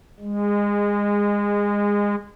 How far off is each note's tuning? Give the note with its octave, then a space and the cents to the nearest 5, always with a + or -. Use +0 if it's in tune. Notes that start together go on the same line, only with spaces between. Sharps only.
G#3 -25